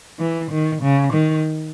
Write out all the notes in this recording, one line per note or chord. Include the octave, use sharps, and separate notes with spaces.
E3
D#3
C#3
D#3